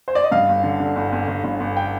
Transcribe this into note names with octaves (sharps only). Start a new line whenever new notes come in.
C5
D5
D#5
G2 F5
G1
D3
D3
G1
G1
G1
G1
G1
G5